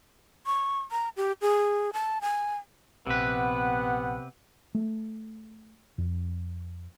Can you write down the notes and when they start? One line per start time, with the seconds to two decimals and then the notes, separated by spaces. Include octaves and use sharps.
0.46 C#6
0.91 A#5
1.17 G4
1.42 G#4
1.93 A5
2.22 G#5
3.07 A#1 C3 B3 G4 B4 F#5
4.75 A3
5.98 F2